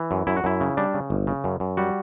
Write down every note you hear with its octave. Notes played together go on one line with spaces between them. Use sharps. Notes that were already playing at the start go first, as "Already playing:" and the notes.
Already playing: E3
F#2
F#2 E4
F#4
F#2 E4
C#3
G3 D4
C#3
G1
C#3
F#2
F#2
G3 F#4